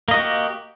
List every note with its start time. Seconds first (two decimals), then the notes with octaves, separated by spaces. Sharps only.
0.08 A#3
0.11 D#5
0.14 F#4
0.17 G4